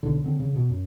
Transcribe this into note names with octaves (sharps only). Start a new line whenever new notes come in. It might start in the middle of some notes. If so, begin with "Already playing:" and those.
B1 D3
D3 C4
C#3
B2
F#2